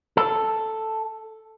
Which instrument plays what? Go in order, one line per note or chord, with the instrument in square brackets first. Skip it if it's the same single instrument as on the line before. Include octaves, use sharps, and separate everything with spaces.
[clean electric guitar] A4